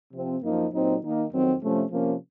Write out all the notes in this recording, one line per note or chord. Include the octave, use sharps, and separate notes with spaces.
C3 F3 C4
F#2 F3 A#3 D#4
A#2 F#3 C4 D#4
D#3 A#3 D#4
F2 D#3 F#3 C4
C3 F3 A3 C#4
C3 F3 A#3 C#4